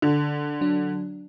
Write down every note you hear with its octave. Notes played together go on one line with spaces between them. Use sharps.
D3
F#3 D4